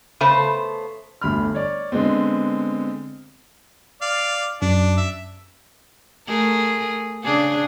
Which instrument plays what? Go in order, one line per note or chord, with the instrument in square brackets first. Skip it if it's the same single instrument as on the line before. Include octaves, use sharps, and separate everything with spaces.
[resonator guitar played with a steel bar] C#3 A3 B3 C5 A5
[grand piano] G1 D2 B5 F6
C#5 D5
D3 G#3 B3 C4
[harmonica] D5 F5
[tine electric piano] F#2 [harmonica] D4
[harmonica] E5
[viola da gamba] A3 G#4 A#4
C#3 D4 G#4